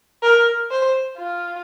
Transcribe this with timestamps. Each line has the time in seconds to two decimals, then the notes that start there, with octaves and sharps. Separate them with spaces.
0.23 A#4
0.71 C5
1.17 F4